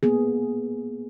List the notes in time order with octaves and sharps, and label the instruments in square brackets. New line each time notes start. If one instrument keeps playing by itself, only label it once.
[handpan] A#3 B3 G#4